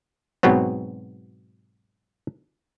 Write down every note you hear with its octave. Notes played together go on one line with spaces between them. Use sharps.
G#2 B2 F#3 B3 C4